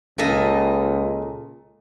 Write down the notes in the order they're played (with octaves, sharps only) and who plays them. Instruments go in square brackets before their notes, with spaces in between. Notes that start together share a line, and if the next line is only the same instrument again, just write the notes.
[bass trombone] C#2 [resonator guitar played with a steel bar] A#2 A4 D#5